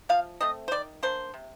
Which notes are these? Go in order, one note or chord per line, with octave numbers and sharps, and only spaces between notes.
F3 F5
A3 C4 D#5
C5
D#3 D5
A#3 D4 C5
C3